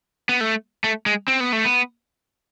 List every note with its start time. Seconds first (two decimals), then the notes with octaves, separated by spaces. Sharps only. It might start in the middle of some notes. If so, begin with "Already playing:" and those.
0.29 B3
0.41 A3
0.84 A3
1.06 G#3
1.28 C4
1.40 B3
1.53 A3
1.65 B3